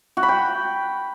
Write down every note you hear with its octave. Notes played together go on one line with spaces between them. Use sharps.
F#4
B5
G5